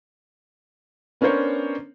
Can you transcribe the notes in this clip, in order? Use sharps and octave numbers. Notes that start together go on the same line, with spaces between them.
B3 C#4 D4 A#4 C5 C#5